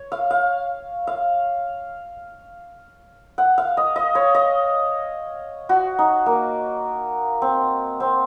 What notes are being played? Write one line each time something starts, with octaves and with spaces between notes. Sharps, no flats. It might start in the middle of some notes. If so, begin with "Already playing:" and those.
Already playing: C#5
F5
F5
F5
F#5
F5
D#5
D#5
C#5
D#5
F#4
D#4
A#3
C4
C4